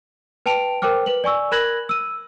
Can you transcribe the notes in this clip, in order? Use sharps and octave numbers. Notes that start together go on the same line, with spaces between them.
B4 G5 A5 D7 F7
A#4 C5 G5 D6 F6
B4 F#7
D5 G#5 C#6 E6
A#4 B5 F#6 G#6 A#6 F#7
E6 D#7